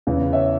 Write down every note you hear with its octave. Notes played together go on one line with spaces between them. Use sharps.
E2 C#3 E3
C#5 E5